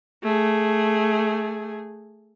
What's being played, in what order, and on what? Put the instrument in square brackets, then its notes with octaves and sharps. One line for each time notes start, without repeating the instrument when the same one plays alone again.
[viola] A3 G#4